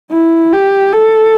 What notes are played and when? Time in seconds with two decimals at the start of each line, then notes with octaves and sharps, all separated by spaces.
0.11 E4
0.53 G4
0.93 A4